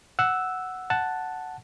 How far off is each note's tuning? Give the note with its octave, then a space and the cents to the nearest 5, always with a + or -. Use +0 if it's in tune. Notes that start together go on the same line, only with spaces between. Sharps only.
F#5 +0 E6 +0
F#5 +0 A5 +0